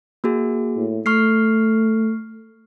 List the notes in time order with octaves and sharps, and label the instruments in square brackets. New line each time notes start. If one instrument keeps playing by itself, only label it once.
[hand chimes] A#3 F#4 G#4
[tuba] A2
[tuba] A3 [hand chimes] C#6 F6 C7